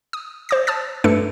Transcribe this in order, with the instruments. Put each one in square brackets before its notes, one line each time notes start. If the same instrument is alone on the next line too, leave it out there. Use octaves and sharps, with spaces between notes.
[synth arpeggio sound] D#6
C5 D6 A#6
A5 D#6 F6 A6
G2 A3 D4 A4 B4 C#7